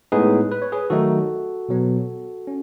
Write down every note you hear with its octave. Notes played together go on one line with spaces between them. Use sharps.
A2 G#3 B3 D#4 G#4 B4
B4
C#5
G#4 B4
D#3 F#3 A3 D#4 F#4 A4
B2 F#3 B3
C#4